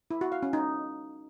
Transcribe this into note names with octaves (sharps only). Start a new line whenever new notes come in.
E4
F#4
F5
C#4
D#4